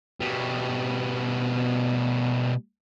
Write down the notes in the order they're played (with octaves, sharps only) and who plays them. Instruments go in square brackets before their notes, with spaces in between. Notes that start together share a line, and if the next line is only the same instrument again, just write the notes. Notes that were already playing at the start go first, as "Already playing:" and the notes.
[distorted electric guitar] B2 G3